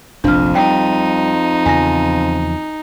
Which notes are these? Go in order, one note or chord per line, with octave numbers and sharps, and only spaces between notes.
F1 A#1 F2 D4 F6
G3 D#4 G5
E2 C#3 F3 G#5 A#6